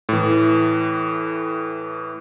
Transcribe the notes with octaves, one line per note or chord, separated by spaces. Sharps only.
A2 E3